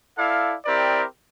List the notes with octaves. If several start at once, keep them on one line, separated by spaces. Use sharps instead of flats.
E4 A4 D5 F5
C4 E4 G4 A#4 D5